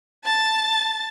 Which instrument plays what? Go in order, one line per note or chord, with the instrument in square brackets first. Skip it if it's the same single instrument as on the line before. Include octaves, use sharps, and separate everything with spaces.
[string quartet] A5 A6